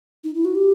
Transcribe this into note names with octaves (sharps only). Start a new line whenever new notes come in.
D#4
E4
F#4
G4